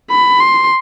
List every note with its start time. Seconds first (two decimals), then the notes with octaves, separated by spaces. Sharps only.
0.10 B5
0.41 C6